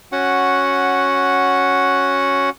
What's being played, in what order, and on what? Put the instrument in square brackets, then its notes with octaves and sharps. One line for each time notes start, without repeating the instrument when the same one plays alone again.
[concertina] C#4 F#4 F#5